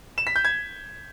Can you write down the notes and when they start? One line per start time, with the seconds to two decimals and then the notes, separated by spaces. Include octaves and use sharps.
0.18 E7
0.27 B6
0.36 G6
0.45 G#6